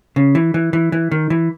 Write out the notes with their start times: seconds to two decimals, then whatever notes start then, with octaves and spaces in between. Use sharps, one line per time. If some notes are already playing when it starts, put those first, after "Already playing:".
0.16 C#3
0.35 E3
0.54 E3
0.73 E3
0.92 E3
1.11 D#3
1.30 E3